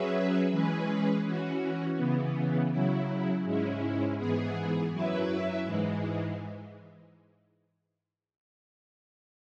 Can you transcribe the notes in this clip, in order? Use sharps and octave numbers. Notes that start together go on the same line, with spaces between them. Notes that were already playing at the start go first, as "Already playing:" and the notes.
Already playing: F#3 C#4 G#4 B4 E5
E3 G#3 C#4 G#4 B4
E3 C#4 F#4
C#3 E3 B3
C#3 F#3 E4
G#2 G#3 C#4 E4
G#2 E3 B3 G#4
F#2 F#3 E4 B4 E5
G#2 E3 G#3